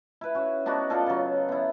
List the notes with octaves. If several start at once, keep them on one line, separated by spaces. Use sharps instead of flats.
E4 B4
C#4 F#4
B3 D4 D#4 F#4
D4 F4 G#4 A4
C#3 F#3
B3 E4